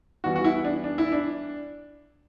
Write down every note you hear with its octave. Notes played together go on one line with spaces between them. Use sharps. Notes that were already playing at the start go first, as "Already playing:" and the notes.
E3 G3 B3 F#4
F#4
E4
D4
D4
E4
D4